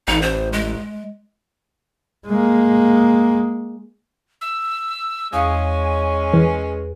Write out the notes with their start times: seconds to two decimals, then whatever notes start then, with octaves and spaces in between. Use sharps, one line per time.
0.08 A1 D#4
0.22 C5
0.53 G#3
2.27 G#3 A#3
4.41 E6
5.33 E2 G#3 C#4 F5 G#5 D#6
6.34 E3 G#4 B4